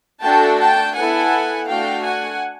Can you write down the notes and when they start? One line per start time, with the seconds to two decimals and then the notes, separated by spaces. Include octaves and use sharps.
0.22 A3 D4 F#4 A4 G5 A5
0.58 G5 A5
0.95 B3 E4 A4 F#5 G#5
1.67 A3 D4 F#4 F5 G5
2.04 F#5 G#5